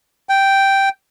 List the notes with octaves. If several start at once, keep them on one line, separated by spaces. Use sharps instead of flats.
G5